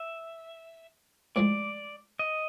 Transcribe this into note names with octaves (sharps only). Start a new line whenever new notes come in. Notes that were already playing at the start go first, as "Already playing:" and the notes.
Already playing: E5
A2 F3 G#3 D5
D#5